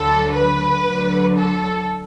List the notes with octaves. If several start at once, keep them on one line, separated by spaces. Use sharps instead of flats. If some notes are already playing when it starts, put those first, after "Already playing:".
Already playing: D2 D3 F#3 A4
B4
D2 D3 F#3
A4